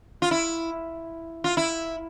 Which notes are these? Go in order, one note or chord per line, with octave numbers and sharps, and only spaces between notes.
F4
E4
F4
E4